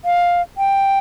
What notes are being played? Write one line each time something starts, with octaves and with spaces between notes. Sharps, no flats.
F5
G5